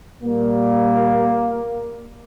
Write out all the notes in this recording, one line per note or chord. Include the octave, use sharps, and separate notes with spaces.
A#2 G3 A#3